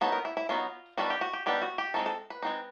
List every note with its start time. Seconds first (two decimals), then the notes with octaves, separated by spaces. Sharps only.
0.01 F#3 B3 D#4 A4
0.12 A#4
0.25 E4
0.37 E4
0.49 F#3 B3 D#4 F4
0.97 D#3 G3 B3 D4 F#4
1.10 G4
1.21 F#4
1.33 G4
1.46 D#3 G3 B3 D4 G4
1.62 F#4
1.78 G4
1.94 G#3 C4 D#4 A4
2.06 A4
2.30 B4
2.42 G#3 C4 D#4